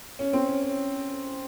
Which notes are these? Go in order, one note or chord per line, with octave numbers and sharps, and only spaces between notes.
C#4
C4
C#4
C#4